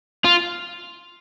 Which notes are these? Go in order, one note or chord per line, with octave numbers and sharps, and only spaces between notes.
F4